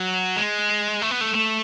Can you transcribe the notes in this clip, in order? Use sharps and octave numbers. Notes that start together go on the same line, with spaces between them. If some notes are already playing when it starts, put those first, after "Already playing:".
Already playing: F#3
G#3
A3
B3
A3
A3